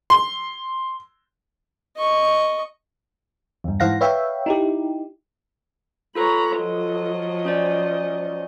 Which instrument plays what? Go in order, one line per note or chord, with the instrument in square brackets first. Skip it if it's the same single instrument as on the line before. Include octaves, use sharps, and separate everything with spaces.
[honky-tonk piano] C6
[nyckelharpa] D#5 C#6
[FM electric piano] E2 G2
G#2 E3 C5 F5 F#5 A#6
B4 C#5 E5 F5 G5
D#4 E4 G4
[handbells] F4 A4 B4 [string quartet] C#5 A#5 B5
[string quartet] F3 F#3 D#5
[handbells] C#4 C5 D5